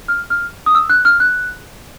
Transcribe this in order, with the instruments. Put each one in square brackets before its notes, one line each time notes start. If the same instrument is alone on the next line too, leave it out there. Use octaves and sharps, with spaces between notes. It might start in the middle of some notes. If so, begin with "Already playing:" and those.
[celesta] F6
F6
D#6
E6
F#6
F6
F#6